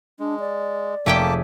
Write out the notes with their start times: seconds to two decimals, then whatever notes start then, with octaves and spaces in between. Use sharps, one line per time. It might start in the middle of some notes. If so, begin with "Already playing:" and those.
0.20 G#3 D4
0.40 D5
1.06 F1 A3 A#3 G4 G#4 G5 A5 D6